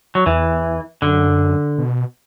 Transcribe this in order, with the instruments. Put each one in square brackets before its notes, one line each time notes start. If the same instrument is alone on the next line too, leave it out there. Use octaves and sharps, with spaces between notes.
[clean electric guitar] F#3
[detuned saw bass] E2 [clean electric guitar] E3
[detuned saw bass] F#2 [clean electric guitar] D3
[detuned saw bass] B2